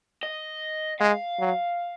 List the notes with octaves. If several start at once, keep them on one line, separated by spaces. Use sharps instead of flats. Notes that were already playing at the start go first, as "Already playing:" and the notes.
D#5
G#3 F5
F#3